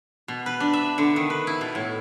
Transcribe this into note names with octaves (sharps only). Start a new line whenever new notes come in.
B2
B4
D4
E5
D3
D#3
B4
E4
B2
A2